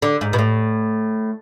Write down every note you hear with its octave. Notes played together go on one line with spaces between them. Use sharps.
D3
G#2
B2
A2